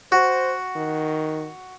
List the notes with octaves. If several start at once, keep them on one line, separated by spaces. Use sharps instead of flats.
F#4 C5
D#3